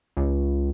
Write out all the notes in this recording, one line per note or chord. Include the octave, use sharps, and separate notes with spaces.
C#2